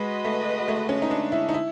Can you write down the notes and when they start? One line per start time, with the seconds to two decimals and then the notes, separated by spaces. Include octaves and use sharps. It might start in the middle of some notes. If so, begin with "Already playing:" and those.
Already playing: G#3 F#4 B4 D#5
0.25 A3
0.68 A3
0.89 C#4
1.02 D#4
1.11 D4
1.32 E4
1.49 D#4
1.54 E4